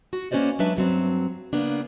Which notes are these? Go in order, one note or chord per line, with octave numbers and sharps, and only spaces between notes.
F#4
A#3 C#4 B4 C5 D5 D#5
F#3 G#3 D4 B4 E5
G2 F#3 C4
C#3 A#3 B3 D4